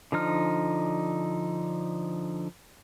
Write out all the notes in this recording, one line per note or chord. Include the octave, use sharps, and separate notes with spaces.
D3 F3 D#4 F6